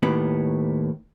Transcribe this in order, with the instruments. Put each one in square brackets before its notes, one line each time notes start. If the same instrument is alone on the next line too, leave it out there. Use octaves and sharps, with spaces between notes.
[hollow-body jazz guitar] D#2 A2 B3